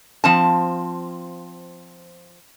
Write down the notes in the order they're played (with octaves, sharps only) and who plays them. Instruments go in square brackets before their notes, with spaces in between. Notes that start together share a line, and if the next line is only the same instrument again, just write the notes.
[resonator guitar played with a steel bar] F3 C4 A5